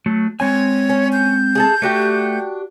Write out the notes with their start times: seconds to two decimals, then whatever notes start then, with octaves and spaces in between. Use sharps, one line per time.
0.06 F#3 A3
0.40 G#3 C4 C#5 G#5
0.89 C#4
1.12 G6
1.55 G#4 A4 A5
1.82 A3 D4 F#4 G4